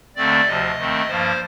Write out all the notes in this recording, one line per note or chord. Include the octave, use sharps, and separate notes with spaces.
D#2 D3 A3 C4 D5
D2 C3 F3 D#5
D#2 D#3 A3 C4
G2 F3 A#3 C5